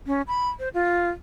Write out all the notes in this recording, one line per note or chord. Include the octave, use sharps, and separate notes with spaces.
C#4
B5
C5
F4